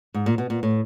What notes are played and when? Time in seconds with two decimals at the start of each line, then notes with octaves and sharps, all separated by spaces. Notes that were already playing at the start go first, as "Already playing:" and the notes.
0.14 G#2
0.26 A#2
0.38 B2
0.50 A#2
0.63 A2